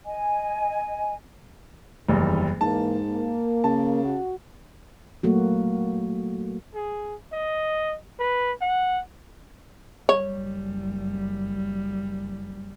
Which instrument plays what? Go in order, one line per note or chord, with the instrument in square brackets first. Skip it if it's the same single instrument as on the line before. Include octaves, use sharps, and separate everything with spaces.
[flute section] D#5 G#5
[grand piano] F#1 E2 G3 [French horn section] D#3
[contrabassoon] G#2 [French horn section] E3 G#3 A#3 [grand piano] A5
[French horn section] A#3
[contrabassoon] C#3 [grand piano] A5
[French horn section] F#4
[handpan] F#3 A3 A#3 F#4
[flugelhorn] G#4
D#5
B4
F#5
[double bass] F#1 G3 [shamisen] C#5